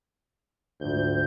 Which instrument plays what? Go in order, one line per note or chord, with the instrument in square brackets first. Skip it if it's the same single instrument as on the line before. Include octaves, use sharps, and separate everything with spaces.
[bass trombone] D2 [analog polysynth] G#2 F3 G6